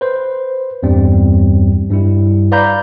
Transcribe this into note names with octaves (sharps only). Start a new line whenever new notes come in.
B4 C5
E2 G2 G3 C4
G2 G3 E4
B4 D5 F5 A#5 B5 G6